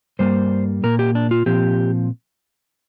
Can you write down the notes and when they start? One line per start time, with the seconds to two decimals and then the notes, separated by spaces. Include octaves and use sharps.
0.19 G2 G3 A#3 C5
0.83 A#2 A#3 A#4
0.99 G4
1.15 D4
1.31 F4
1.46 A#2 F3 C4 G4